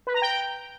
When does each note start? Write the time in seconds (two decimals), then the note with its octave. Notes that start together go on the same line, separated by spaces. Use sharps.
0.07 B4
0.14 A#5
0.22 G5